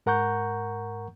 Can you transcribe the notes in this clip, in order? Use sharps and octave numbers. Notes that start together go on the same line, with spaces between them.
G#2 A#4 F#5 A#5 C#6 G6